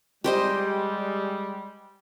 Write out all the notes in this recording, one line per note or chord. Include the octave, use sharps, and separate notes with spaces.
G3 G#3 G4 C5 D#5